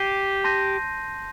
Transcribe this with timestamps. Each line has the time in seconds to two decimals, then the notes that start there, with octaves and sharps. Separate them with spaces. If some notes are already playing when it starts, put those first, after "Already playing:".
Already playing: G4 G6 C7 D#7
0.44 A5 C6 G6 A#6 D#7